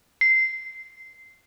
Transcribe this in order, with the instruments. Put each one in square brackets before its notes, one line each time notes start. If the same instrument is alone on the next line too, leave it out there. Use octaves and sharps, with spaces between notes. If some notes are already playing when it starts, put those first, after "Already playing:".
[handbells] C7